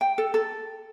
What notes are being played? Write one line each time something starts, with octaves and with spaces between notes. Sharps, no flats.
G5
A4
A4